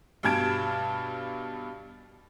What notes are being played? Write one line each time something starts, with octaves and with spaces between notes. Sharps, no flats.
G2 B2 G3 A5 G#6 D7